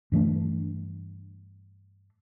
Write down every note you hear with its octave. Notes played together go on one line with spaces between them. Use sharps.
G2 E3 A3 D4